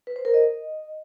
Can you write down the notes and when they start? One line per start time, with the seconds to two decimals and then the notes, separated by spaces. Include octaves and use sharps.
0.07 B4
0.16 C5
0.25 A#4
0.34 D#5